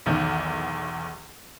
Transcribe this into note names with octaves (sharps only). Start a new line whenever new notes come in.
B1 E2 D#3